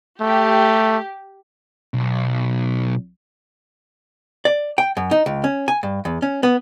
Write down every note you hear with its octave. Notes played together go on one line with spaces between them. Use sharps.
A3 G4
B1
D5
G5
F#2
D#4
C#2
C#4
G#5
G2
E2
C#4
B3